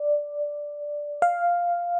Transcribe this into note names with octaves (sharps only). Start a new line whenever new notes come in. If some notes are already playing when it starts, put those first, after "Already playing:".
Already playing: D5
F5